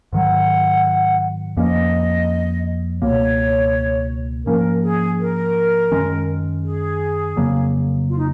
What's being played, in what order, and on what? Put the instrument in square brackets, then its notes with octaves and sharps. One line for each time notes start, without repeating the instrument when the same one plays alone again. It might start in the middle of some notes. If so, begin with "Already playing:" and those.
[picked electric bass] G#2 D#3 F#3 [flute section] F#5
[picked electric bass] F2 F3 A#3 C#4 [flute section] D#5
[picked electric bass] C#2 B2 A#3 [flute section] C#5
[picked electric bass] G#2 F3 A#3 C#4 [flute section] A#4
[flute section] G#4
A#4
[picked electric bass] F#2 D#3 G#3 C#4
[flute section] G#4
[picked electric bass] F2 C#3 F#3 A#3
[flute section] F4
D#4